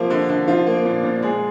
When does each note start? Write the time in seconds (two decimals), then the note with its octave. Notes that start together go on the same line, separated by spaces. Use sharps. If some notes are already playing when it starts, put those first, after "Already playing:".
Already playing: C3 F3 A#3 F4
0.10 D3
0.29 D3
0.48 F3 F4
0.67 A#3
0.85 A#2
1.04 A#2
1.22 G#3 G#4